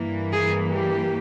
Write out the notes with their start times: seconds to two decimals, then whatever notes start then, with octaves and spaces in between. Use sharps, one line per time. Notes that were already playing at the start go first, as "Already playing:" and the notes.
Already playing: G2 E3 A#3
0.32 G#4
0.75 G4